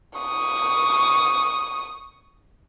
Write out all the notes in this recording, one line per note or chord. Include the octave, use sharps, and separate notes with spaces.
C#6 D#6